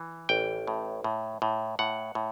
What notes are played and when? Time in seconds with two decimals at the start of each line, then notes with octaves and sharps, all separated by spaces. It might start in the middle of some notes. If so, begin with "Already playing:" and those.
Already playing: E3
0.29 A1 G5
0.67 A2
1.04 A2
1.42 A2
1.79 A2 F#5
2.15 A2